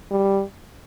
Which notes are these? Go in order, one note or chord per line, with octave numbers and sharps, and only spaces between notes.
G3